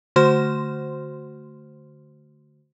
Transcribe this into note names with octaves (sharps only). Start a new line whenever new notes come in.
D3 A3 F#4 C5 C6 F6